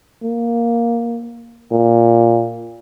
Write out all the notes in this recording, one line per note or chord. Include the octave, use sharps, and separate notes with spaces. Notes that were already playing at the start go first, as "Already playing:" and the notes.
A#3
A#2